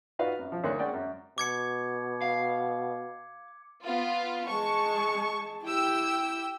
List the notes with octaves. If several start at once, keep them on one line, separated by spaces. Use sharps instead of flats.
D#4 F4 F#4 B4 D5 F5
F#2
F3
D2 A#3 D#4 C#5 C6 F#6
G#3 C#4 D5 F#5 G5
F#2
B2 D6 G#6 C#7
F5
B3 F4
G#3 A5 C#6
E4 G4 G5 E6